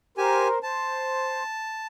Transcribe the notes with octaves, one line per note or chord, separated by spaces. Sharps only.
G4 A#4 C5 G#5
C5 A5